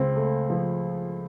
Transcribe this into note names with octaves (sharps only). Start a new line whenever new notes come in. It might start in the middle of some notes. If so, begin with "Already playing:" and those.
Already playing: C#2 C4
A3
F3